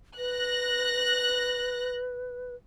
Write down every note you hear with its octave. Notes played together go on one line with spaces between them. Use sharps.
B4 F#6 A#6